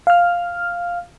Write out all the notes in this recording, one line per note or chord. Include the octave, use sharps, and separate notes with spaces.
F5 F6